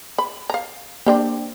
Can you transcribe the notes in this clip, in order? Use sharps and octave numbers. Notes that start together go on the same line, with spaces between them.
B5
F5 A#5
A#3 C4 D4 G4